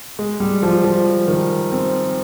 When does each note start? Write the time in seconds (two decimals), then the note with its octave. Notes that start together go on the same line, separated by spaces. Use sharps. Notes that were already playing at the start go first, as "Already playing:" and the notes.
0.19 G#3
0.40 G3
0.63 F3
0.84 F3
1.28 D#3
1.72 C4